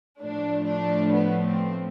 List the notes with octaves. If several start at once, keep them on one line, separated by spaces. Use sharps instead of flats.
A2 F3 A3 D4
D4
B3
C4